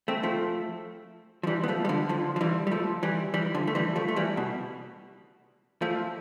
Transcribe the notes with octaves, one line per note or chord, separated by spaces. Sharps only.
A3 C4
F3 A3
F3
E3 G3
B3
F3 A3
G3
D3 F3
D3 F3
F3
E3 G3
G3
F3 A3
E3 G3
E3 G3
D3 F3
A3
E3 G3
F3 A3
A3
E3 G3
B2
F3 A3